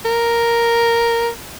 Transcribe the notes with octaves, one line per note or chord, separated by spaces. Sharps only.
A#4